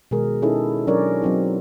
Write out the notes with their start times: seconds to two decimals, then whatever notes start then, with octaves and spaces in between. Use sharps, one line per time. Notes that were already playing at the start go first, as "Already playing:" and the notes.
0.11 B2 D#3 G#3 G#4 A#4
0.42 C#4 D#4 E4 G#4 A4
0.87 F#3 C#4 D4 A#4 C#5 D5
1.22 F#3 C4 D#4